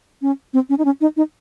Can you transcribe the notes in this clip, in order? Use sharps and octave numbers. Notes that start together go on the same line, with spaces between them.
C#4
C4
C#4
D#4
C#4
D#4
D#4